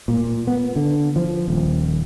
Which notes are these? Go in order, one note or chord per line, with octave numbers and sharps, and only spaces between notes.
A#2
B3
D3
F3
D#1